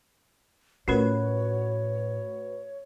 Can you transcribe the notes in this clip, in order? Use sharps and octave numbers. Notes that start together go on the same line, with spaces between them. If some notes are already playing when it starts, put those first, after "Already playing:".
A2 C#4 F4 F#4 A#4 B4 C#5